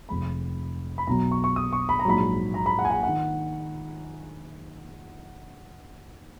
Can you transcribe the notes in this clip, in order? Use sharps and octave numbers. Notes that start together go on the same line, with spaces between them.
F1 F2 F3 G#3 B5
B5
B1 B2 F#3 A#5
C#6
C#6
D#6
C#6
B5
A#5
A#1 G#2 F#3 B5
A#5
B5
F#5
G#5
F#5
D#3 F#5